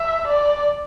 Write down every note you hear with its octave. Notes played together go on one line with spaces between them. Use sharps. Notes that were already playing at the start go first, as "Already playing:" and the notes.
Already playing: E5
D5